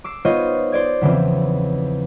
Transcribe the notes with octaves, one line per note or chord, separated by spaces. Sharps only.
D6 E6 C7
B3 D#4 F4 C5 C#5 D#5
C5 D5 G#6
E2 C#3 E3 F3 C4